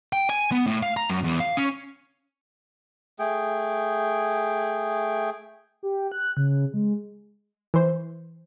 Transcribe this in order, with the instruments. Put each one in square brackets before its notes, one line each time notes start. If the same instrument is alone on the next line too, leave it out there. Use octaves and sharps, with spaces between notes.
[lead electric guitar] G5
G#5
B3
A2
F5
A#5
F#2
E2
F5
C#4
[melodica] A3 G#4 G5
[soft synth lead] G4
F#6
C#3
G#3
[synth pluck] E3 C5